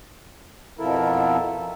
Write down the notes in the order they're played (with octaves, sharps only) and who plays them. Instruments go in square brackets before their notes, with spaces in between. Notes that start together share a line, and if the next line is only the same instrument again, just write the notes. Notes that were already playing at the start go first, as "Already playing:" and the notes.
[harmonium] F2 B2 F3 E4 A4 A#4